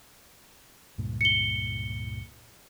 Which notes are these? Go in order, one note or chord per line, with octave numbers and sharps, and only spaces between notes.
C#2 G2 A#2
C#7 G7